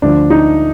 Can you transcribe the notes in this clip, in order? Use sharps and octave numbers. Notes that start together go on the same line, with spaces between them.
D2 D3 F3 D4
D#4